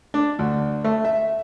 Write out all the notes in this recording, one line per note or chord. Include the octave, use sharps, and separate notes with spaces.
D4
D2
A3
E5